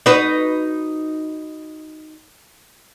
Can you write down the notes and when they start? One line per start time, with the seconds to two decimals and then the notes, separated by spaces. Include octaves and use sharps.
0.06 D#4 F#4 B4